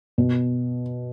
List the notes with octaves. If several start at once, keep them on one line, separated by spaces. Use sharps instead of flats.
B2